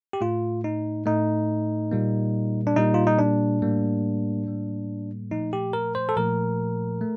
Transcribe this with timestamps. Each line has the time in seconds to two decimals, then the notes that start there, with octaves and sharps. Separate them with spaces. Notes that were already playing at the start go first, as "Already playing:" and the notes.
0.13 G4
0.21 A2 A3 F4
0.64 D#4
1.06 A2 A3 D#4
1.91 A#2 G3 A#3
2.67 D4
2.76 A#2 G3 A#3 D#4
2.94 F4
3.07 D#4
3.19 D4
3.62 A2 G3 A#3
4.46 A2 G3 A#3
5.31 A#2 F3 A3 D#4
5.53 G4
5.73 A#4
5.95 C5
6.09 A4
6.17 A#2 F3 A3 A#4
7.01 A3